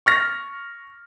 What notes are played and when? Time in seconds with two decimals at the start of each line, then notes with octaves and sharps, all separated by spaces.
0.06 C#6 F6 A#6